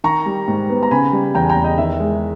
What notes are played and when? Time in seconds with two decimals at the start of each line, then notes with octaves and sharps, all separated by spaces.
0.04 D#3 A#5 C#6
0.26 G3
0.48 G#2
0.69 B3
0.83 A#5
0.91 C#3 G#5 B5
1.12 G3
1.35 E2 G5 A#5
1.43 G#5
1.49 G5 A#5
1.57 E2
1.64 D#5 G5
1.78 D#3 E5
2.00 G#3